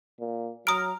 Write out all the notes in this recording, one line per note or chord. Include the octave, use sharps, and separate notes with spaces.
A#2
F#3 A#5 D#6 F6 D7